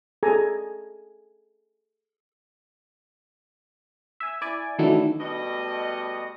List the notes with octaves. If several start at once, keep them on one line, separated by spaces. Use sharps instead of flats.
G#4 A4 G#5 A#5
E5 G#5
E4 D5 G#5
D#3 E3 F#3 A3 D4 E4
B2 G3 A3 D#5